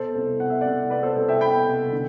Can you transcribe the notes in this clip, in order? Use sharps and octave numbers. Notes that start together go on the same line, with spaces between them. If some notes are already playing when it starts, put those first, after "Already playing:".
Already playing: B2 A4 C5
C2
B2 F#5
E5
C2 D5 F#5
B2 B4 D5
A4 C5
C2 A4
E5 G5
B2 G5 B5
C2
D3